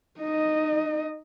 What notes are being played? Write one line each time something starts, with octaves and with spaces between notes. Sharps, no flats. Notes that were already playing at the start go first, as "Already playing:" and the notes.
D#4 D#5